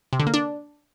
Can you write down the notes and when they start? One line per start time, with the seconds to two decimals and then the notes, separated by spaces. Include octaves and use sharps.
0.13 C3
0.20 D3
0.27 A#3
0.34 D4